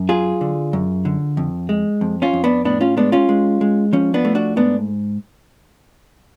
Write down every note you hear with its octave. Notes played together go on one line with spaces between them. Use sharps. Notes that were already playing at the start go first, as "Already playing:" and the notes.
Already playing: F#2
F#3 F4 G#4
D3
F#2
D3
F2
G#3
F2
C#4 F4
F2
B3 D4
A2 B3 D4
C#4 F4
G#3 B3 D4
C#4 F4
G#3
G#3
F3 C#4
B3 D4
A3
D4 F#4
G#2 B3 D4